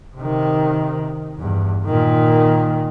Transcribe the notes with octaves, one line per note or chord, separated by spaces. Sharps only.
C3 D#3
E2 G2
A#2 D#3